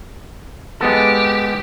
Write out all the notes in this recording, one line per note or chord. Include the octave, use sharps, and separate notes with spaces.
G#3 B3 G4 A4